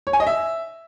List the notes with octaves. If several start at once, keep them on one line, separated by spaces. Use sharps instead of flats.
C#5
G#5
D#5
E5